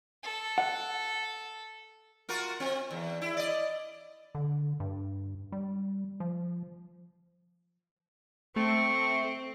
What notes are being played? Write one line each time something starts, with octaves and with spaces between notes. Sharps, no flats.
A4
F#5
F4 F#4 A#4
C4
E2
E4
D5 D#5
D3
G2
G3
F3
A3 C4 C#6